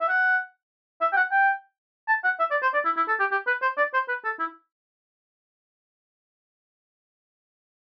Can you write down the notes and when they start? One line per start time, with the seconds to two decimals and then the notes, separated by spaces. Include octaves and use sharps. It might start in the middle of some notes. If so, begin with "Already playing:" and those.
0.01 E5
0.09 F#5
1.01 E5
1.12 G5
1.16 F#5
1.32 G5
2.08 A5
2.24 F#5
2.40 E5
2.51 D5
2.62 C5
2.74 D5
2.85 E4
2.97 E4
3.08 A4
3.20 G4
3.31 G4
3.47 B4
3.62 C5
3.77 D5
3.94 C5
4.08 B4
4.24 A4
4.39 E4